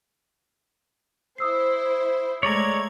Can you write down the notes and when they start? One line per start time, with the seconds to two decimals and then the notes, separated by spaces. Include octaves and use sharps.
1.38 E4 C5 D#6 E6 C7
2.43 G#3 A3 C#5 D5 A#5 G#6